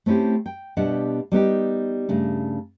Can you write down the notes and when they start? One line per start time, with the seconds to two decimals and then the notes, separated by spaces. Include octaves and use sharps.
0.06 A3 C4 C#4 E4 G4
0.46 G5
0.77 B2 G3 D4 G4 E5 F#5
1.32 G3 B3 D#4 G4
2.09 G2 C#3 A3